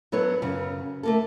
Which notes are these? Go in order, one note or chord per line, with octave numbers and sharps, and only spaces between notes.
F#3 B3 A4 B4 C#5
F#2 C#3
A3 A#3 A4